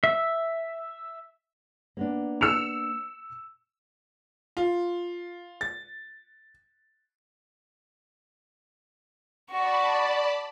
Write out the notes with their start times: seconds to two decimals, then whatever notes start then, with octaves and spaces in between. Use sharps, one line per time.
0.04 E5
1.97 A#3 B3 D4
2.41 E6 C#7 F7
4.57 F4
5.61 A6
9.50 F#4 D5 A5 B5 C#6